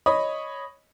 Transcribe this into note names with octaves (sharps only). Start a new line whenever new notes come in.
C#5 D#5 B5 D#6